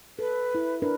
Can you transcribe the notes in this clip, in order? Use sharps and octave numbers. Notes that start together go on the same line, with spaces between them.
A4 B4
E4
D4 A#4 B4